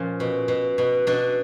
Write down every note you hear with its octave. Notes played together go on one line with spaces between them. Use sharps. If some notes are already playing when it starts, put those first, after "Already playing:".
Already playing: A#2 F3 C#4
B2
B2
B2
B2 D4